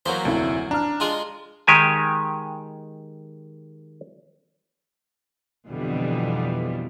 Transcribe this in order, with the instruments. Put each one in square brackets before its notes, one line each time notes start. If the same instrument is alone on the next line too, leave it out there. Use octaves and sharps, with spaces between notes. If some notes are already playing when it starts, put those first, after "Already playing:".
[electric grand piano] E2 [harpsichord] F#3 A#3 C5
[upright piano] F1 E4 [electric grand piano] D2
[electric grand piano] D4 [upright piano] A#5 F6
[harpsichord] G#3 F4 G#4
[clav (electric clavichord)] D#3 G#3 G4 G#5
[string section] F2 B2 D3 E3 F3 G3